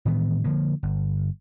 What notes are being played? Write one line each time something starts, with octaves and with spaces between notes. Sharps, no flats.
A2 D#3 E3 B3
D3 F3 A#3
G1